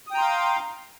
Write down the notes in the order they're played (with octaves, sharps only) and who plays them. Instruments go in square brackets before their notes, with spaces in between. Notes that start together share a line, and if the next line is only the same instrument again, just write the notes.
[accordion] D#6
G5
A#5
C6
F5